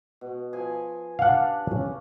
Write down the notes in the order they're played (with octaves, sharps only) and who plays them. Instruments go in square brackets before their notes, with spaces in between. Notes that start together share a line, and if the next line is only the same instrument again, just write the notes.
[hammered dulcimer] B2
F3 G#4 G#5
[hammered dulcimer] D4 G4 D5 [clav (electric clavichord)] F5 F#5
[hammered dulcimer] C#3 C#4